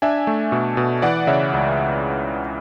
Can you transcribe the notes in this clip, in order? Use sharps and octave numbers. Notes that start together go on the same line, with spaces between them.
D4 E5 G#5
A3
B2
B2
E3 D5 F#5
C#3 C#5 E5
C#2